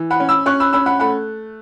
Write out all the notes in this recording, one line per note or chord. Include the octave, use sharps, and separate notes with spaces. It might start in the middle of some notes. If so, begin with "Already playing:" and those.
Already playing: E3
F#5 B5
C#4
B5 E6
C#4 C#6 F#6
B5 E6
C#4 B5 E6
F#5 B5
A3 F#5 B5